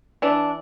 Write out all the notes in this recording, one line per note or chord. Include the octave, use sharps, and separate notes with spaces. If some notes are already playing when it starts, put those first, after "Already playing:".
E3 D4